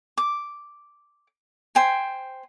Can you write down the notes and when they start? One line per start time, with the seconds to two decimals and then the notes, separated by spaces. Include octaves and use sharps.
0.17 D6
1.75 C5 G5 G#5